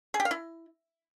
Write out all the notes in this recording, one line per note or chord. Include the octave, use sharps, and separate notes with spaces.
G#4
G4
F5
E4